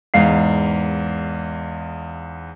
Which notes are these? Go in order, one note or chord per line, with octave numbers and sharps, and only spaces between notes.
E2 G#2 F5 C7